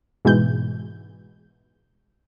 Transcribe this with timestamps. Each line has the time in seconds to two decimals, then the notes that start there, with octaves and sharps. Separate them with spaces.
0.25 G#2 B2 E3 G#3 G6